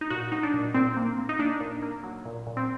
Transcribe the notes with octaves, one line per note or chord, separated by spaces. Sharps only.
D#4
A#2 F#4
F#3 D#4
D4
A#2
A#2 C4
A#3
A#3
D#4
A#3 D4
A#2
A#3
F#3
A#2
A#2
C4